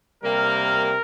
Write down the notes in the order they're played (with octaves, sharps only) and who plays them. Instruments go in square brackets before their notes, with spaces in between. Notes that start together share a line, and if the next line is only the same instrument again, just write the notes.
[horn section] C3 G3 A#3 A#4